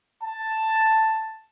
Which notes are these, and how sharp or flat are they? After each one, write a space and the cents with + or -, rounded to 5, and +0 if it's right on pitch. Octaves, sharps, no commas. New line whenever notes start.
A5 +5